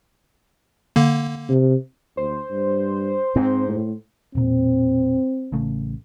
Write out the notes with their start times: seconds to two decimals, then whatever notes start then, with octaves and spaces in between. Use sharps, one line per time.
0.96 D3 A#3
1.49 C3
2.17 D2 C5
2.51 G2
3.36 G#2 C4
3.69 A2
4.35 E1 A#2 C4
5.52 A1 C#3 A3